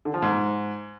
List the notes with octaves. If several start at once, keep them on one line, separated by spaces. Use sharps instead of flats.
D3
F3
G#2